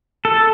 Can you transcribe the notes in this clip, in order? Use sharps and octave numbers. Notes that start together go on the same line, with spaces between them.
A4